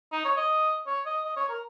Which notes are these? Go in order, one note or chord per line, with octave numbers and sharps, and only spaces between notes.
D#4
C#5
D#5
C#5
D#5
D#5
C#5
A#4